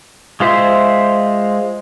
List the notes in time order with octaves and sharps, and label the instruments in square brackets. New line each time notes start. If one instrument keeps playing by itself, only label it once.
[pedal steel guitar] G#3 F4 C5 E5